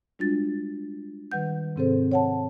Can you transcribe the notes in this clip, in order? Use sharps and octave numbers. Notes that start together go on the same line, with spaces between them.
G3 G#3 D4 F4 F#4 A6
D#3 G3 B4 F#5 G6
G#2 C3 C4 G#4 A4 C5
C#5 F#5 A5